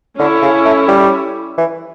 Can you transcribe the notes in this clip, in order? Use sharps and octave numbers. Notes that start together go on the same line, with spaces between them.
D3 C#4 E4 A4 C#5
C#3
A3
G3
E3